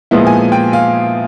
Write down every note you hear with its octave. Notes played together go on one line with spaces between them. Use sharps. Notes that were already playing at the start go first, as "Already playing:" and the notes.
A#2 F3 G#3 B3 E4
G#5
G5
F5